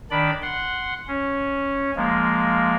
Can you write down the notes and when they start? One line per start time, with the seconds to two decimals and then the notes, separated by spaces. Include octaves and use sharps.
0.11 D#3 D4 D5 B5
0.42 F#5 C6
1.08 C#4
1.96 F3 G#3 A#3